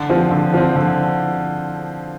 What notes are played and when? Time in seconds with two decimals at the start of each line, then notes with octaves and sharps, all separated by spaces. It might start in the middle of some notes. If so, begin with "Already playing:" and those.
Already playing: D3
0.09 F3 C4
0.31 D3
0.53 F3 C4
0.76 D3